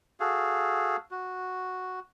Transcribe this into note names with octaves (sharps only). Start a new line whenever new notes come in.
F#4 G#4 A4 F5
F#4